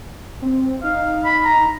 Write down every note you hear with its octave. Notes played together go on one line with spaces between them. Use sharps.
C4
D#4 F5
B5
A#5